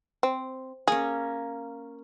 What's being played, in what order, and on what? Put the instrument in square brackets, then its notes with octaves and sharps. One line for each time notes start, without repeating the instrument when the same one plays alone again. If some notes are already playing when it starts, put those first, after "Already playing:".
[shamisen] C4
[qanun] A#3 C#4 [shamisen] G#4